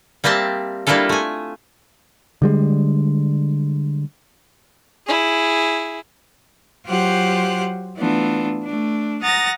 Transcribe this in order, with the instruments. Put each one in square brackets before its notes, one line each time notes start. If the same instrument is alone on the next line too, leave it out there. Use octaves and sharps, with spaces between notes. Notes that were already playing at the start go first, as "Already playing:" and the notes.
[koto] G3 A#3 C4 E5 A5
G3 A#3 D4 E4 F4 A4
A3 G#5
[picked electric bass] D3 G3 G#3
[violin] E4 G#4
[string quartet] F#3 F4 G4 C5 F#5 F#6
E3 A3 B3 D4 F4
A3 D4
F#5 A#5 D#6 A6 A#6